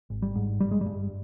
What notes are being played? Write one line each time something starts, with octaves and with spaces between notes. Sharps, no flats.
G#1
G3
G#2
G1 G3
G#3
G2 G3